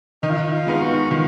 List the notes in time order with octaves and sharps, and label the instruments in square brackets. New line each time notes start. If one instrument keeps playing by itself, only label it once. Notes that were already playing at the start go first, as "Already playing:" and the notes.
[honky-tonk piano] D#3 [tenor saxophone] D#4
[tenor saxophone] F4
D#4
F4
[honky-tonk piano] G#3 B3 D#4
[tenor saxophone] F#4
[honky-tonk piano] D#3 [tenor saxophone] F4